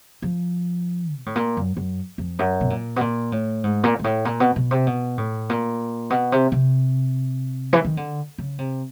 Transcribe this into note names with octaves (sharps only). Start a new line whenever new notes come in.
F3
B2
A2
A#2
F#2
F#2
F2
F#2
B2
A#2
B2
A#2
A2
G#2
A#2
G#2
A2
A#2
B2
B2
C3
B2
A2
A#2
B2
C3
C3
E3
D#3
D3
C#3
C3